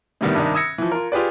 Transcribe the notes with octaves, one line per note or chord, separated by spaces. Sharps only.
A2 C3 D#3 G3 B3
G2 C3 D#3 D4 D#4
D#6 E6 G#6 A#6 C#7
E3 F3
F4 A#4
F4 G4 G#4 B4 D5